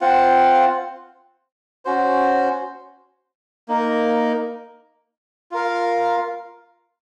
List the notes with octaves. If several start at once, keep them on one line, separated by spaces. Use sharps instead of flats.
C4 F4 C5 F#5
C#4 F#4 C5
A#3 D#4 A#4
F4 A#4 F5